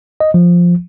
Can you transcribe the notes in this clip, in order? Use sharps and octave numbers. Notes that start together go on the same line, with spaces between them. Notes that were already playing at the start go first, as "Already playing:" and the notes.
D#5
F3